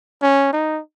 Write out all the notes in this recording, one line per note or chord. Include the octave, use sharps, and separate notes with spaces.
C#4
D#4